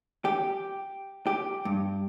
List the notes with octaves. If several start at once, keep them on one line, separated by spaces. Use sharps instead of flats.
G4
G4
G2